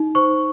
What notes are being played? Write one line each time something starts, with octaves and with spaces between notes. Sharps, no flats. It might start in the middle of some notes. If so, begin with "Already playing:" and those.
Already playing: D#4
C5 C#6